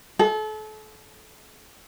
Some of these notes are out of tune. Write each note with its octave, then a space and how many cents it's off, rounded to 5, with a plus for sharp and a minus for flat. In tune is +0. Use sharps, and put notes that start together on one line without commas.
A4 -35